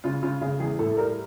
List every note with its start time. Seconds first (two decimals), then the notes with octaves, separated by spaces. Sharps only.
0.04 C#3 F4
0.23 C#3 F4
0.41 C#3 G#4
0.60 E2 G#4
0.79 A2 A4
0.97 G3 A#4